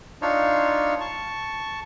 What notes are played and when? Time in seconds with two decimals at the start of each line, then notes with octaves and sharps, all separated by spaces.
0.22 D4 D#4 F4 C#5
1.00 A5 C#6